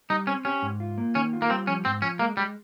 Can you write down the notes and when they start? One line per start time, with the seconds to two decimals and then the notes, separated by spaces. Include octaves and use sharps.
0.10 G3 D#4
0.27 C4 C#4
0.45 C#4 G4
0.62 G#2
0.80 F4
0.98 A#3
1.15 D#3 C#4
1.33 F4
1.42 A#3
1.50 G3 C4
1.67 F3 C#4
1.85 G#2 C4
2.02 F3 C#4
2.19 G#3 A#3
2.37 G3 G#3